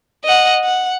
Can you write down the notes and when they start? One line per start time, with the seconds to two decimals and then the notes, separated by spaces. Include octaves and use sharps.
0.24 D#5 F#5
0.64 F#5